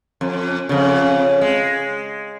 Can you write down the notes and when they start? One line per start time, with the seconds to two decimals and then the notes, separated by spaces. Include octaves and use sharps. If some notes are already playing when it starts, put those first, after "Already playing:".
0.21 F2
0.69 F2 C#3
1.41 G#3